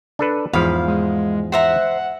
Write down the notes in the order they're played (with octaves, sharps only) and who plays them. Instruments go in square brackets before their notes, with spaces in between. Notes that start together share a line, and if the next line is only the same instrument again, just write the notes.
[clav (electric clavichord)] D4 A4 B4
[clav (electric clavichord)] E2 G#2 F3 [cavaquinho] F5 B5
[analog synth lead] G#3
[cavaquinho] C5 E5 A#5 [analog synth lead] F#5